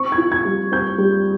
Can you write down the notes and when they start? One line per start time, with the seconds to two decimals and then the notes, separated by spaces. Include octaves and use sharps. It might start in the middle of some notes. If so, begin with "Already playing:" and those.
Already playing: C4 C#6
0.12 G#6
0.18 F4
0.32 G#6
0.45 G3
0.72 C4 G6
0.98 G3